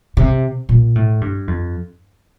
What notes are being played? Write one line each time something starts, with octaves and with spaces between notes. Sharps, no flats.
C3
A#2
A2
G2
F2